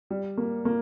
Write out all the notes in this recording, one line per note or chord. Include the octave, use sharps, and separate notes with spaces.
G3
A#3
A#3